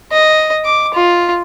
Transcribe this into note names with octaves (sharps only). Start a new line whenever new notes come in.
D#5
D6
F4